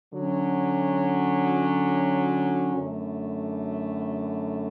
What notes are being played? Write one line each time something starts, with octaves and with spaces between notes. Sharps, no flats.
D3 F#3 C#4
F#2 D3 A3